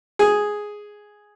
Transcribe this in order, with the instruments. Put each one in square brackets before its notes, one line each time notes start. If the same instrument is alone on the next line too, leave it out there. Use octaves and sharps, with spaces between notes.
[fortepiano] G#4